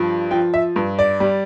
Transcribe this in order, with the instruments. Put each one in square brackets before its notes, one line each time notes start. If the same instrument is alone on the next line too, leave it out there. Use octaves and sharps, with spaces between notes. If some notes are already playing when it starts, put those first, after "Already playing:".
Already playing: [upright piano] G2 F3
F3 G5
E5
G2
D5
G3